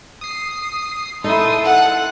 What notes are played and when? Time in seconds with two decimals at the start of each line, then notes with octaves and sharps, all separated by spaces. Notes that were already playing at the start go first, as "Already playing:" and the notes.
0.21 D#6 C7
1.24 D#4 E4 A4 C6 D#6
1.63 F#5